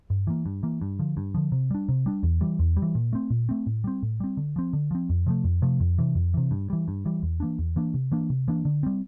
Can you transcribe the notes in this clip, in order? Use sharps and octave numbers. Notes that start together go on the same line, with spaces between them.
G2
E3 A#3
G2
E3 A#3
G2
D3 F3
G2
D3 F3
C3
G3 D4
C3
G3 D4
E2
E3 G3
E2
G3
E3
A#2
A3 C4
A#2
A3 C4
A2
G3 C4
A2
G3 C4
D3
F3 C4
D3
F3 C4
F2
C3 F3 A3
F2
C3 F3 A3
F2
C3 E3
F2
C3 E3
G2
E3 G3
G2
E3 G3
E2
E3 A#3 D4
E2
E3 A#3 D4
C3
E3 A#3 D4
C3
E3 A#3 D4
D3
G3 C4